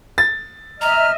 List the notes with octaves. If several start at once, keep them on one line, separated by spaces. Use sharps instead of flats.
A6
D#5 E5 A#5 F6